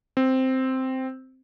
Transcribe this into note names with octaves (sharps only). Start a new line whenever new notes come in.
C4